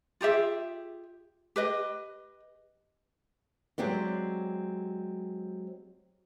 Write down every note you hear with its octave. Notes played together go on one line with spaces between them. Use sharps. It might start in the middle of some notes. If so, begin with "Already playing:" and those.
F4 G4 G#4 E5
G4 B4 D#5
F#3 G#3 C4 G4 D5